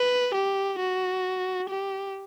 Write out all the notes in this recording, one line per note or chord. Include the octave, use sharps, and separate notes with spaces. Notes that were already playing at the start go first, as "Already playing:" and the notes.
Already playing: B4
G4
F#4
G4